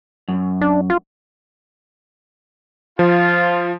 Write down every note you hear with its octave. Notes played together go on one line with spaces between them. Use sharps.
F#2
D4
F4
F3 F4